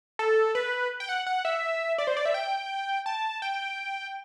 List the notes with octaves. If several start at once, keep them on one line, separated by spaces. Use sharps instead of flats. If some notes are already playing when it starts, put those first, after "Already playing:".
A4
B4
G5
F#5
F#5
E5
D5
C5
D5
E5
G5
A5
G5